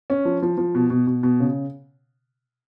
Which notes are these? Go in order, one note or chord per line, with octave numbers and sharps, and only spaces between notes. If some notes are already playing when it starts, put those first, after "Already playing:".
C#4
F3
F3
F3
B2
B2
B2
B2
C#3